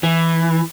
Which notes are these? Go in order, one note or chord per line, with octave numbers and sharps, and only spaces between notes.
E3